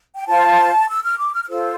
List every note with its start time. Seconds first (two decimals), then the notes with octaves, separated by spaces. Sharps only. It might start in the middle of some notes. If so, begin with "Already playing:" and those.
0.16 G5
0.27 F4 C5 A5
0.89 E6
1.03 F6
1.18 D6
1.34 F6
1.44 F6
1.48 F4 A4 C5 E6